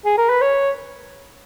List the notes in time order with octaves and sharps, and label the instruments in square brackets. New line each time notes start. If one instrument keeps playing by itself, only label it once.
[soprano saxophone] G#4
A#4
B4
C#5